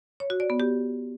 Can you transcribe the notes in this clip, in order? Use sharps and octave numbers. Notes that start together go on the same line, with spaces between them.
C#5
F#4
D5
B3
G4